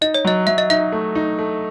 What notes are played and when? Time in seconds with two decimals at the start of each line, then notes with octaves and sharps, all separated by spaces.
0.01 D#4 D#5
0.14 C#5
0.25 F#3 D#5
0.47 F#3 E5
0.58 D#5
0.70 D#4 E5
0.92 A3
1.15 D#4
1.39 A3